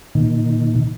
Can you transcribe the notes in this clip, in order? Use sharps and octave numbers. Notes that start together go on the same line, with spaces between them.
A#2 D#3